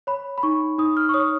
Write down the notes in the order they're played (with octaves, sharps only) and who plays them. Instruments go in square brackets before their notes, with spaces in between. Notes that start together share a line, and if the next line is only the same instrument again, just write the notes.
[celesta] C#5 B5
B5
D#4 C#6
D#4 D#6
F6
C#6
C#5 D#6